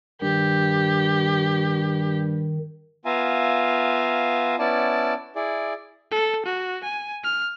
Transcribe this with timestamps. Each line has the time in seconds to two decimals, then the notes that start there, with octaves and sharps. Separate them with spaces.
0.22 G2 D#3 G4
3.05 B3 F4 E5 F5 G#5 A#5
4.59 B3 C#4 E4 D5 A5
5.36 E4 G#4 D5
6.12 A4
6.46 F#4
6.84 G#5
7.24 F6